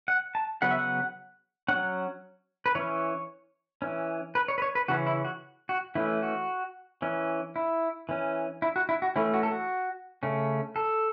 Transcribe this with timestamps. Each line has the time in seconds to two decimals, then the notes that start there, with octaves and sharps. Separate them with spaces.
0.08 F#5
0.35 A5
0.62 C#3 F#3 B3 F#5
0.71 E5
0.79 F#5
1.68 F#3 C#4 F#5
2.66 B4
2.75 E3 C#4 C#5
3.82 E3 C#4
4.35 B4
4.48 C#5
4.58 B4
4.62 C#5
4.75 B4
4.88 C#3 E3 C#4 F#4
5.06 E4
5.25 F#4
5.69 F#4
5.95 E3 A3 C#4 E4
6.22 F#4
7.02 E3 C#4
7.56 E4
8.09 E3 C#4
8.62 E4
8.76 F#4
8.89 E4
9.02 F#4
9.16 E3 A3 C#4 E4
9.34 F#4
9.43 A4
9.51 F#4
10.23 C#3 A3 C#4
10.76 A4